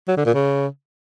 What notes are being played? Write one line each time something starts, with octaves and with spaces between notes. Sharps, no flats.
F#3
D3
A#2
C#3